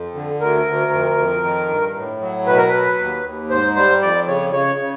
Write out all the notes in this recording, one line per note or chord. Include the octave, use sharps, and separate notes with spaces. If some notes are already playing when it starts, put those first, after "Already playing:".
Already playing: F2
D3
D2 A#4
D2
F2
F2
D#3
G2
A2
F#3
B2 B4
A#4
F#3 B4
D#2
D#2
G#2 C5
G3 C5
F2 D5
C#3 C#5
C#3 C#5
C#3